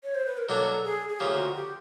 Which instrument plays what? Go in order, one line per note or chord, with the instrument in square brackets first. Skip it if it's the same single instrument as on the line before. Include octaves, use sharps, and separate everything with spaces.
[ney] C#5
C5
B4
A#4
[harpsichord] B2 F#3 A#3 D4 [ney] A4
[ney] G#4
G#4
[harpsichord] D2 C#3 F3 A#3 [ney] G4
[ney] F#4
G4